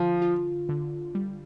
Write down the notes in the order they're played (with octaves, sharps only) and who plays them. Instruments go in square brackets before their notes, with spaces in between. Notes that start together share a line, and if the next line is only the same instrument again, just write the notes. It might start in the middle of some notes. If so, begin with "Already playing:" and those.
Already playing: [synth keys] D3 F4 [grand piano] F3
[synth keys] F4
D3
G3